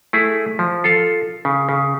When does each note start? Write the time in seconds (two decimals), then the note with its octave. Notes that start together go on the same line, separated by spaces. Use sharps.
0.13 A3 E4 G#4
0.59 F3
0.84 F4 A4 F5
1.45 C#3
1.69 C#3